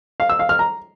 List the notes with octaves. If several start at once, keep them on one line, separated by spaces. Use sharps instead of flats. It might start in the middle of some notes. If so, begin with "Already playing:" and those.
F5
E6
F5
F6
A#5